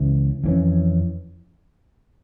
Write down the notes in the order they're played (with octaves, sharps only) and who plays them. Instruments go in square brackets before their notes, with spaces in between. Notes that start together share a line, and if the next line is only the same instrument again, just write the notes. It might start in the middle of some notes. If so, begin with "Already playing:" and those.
Already playing: [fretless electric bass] C#2 C#3 E3
F2 E3 A#3 C#4